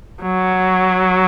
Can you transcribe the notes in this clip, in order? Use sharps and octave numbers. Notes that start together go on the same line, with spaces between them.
F#3